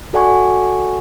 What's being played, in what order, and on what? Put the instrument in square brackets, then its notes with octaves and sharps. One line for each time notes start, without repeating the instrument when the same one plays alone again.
[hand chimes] F#4 A4 D5 F#5 G#5 C#6